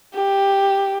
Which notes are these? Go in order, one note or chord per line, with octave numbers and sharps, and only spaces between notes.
G4